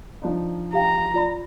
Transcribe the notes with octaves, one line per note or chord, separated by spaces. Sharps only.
F3 D4 D#4
G4 F5 G5 A#5
F4 D5 B5